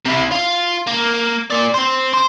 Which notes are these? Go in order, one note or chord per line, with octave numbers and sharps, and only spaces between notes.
C3 E4
F4
A#3
A#3 D5
C4 C5
C5